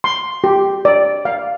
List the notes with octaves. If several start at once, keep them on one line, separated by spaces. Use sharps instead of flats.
C6
G4
D5
F5